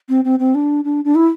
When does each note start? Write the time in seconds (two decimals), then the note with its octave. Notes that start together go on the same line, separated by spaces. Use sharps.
0.09 C4
0.25 C4
0.39 C4
0.55 D4
0.85 D4
1.05 D4
1.15 E4